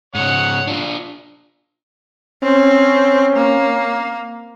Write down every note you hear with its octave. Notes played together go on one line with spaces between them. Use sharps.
G#2 C#3 C#5 F#5
D4 F4
C4 C#4
A#3